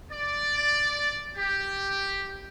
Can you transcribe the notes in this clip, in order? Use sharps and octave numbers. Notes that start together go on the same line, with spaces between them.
D5
G4